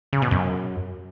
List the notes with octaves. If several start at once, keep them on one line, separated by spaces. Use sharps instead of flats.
C#3
B2
F#2